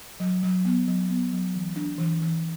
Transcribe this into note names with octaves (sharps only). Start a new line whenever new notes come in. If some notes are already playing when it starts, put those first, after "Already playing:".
F#3
F#3
B3
F#3
B3
F#3
E3
D4
E3
E3